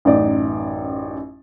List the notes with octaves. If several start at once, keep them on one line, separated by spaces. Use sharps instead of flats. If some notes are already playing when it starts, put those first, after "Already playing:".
A1 F#2 D#4 D5